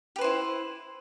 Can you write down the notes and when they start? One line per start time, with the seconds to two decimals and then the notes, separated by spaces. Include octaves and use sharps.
0.16 G4
0.19 B4
0.21 C5
0.24 E4